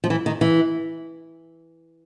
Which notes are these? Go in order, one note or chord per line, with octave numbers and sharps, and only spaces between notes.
F3
E3
D#3
E3